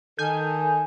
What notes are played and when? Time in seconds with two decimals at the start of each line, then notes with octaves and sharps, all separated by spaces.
0.19 D#3 A4 G#5 G6